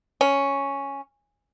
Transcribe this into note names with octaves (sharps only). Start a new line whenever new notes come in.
C#4